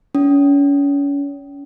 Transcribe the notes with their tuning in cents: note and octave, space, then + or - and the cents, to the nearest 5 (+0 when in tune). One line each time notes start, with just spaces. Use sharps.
C#4 +35